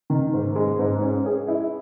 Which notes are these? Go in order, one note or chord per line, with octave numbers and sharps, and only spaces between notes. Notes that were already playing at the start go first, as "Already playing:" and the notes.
D#3
G#2
G#3
G#2
C#4
G#4
E4